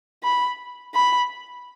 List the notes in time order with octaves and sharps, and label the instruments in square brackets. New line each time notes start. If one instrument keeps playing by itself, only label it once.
[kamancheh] B5
B5